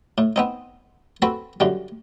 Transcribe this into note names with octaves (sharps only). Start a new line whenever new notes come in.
A2
B3 C4 D#4
C4 F#4 A4 B4
F#2 D3 G3